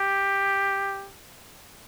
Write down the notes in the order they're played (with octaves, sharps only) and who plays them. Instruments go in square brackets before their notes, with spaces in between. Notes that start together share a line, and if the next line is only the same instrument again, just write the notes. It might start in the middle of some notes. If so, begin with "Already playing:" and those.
Already playing: [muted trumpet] G4